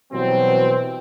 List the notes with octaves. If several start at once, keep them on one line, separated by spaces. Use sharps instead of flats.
B2 E3 F#3 G3 C4